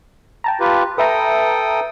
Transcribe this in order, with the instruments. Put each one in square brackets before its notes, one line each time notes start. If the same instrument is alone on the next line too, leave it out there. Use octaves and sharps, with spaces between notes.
[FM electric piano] G5 A5 A#5
[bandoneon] F4 G4 B4
[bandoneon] A4 G5 D#6 [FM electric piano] B4 E5 A#5